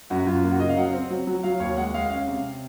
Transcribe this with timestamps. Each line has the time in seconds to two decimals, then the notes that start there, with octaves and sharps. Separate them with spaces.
0.10 F#2 F#4
0.27 F#2 F4
0.43 A#3 F4
0.52 F#4
0.60 C#3 D#5
0.69 F5
0.77 F#3 F#5
0.93 C4
1.10 F#3
1.27 F#3
1.43 F#3 F5
1.60 D#2 C#5
1.77 G#3 F#5
1.94 G#3 F5
2.10 C#4 F5
2.28 C3